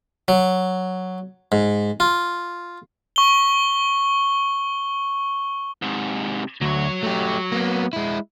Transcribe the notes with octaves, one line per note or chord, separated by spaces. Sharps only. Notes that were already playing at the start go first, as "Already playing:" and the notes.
F#3
G#2
F4
C#6 G7
G#2 C3
D2 F#3 C#5
A3 G4
A#3 B3
G#3 E4